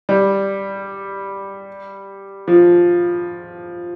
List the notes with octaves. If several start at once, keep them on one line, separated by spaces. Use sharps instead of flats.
G3
F3